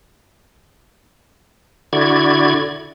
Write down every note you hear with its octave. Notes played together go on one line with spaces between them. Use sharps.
D3 E4 F#4 D5 G#6